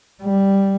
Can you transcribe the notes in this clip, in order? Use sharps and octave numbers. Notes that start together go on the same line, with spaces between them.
G3